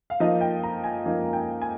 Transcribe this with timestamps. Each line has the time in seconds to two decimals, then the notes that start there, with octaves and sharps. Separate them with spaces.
0.10 F5
0.20 F3 A#3 D#4 D#5
0.41 G5
0.63 A#5
0.84 G#5
1.05 F3 A#3 D#4 F5
1.33 G5
1.62 G#5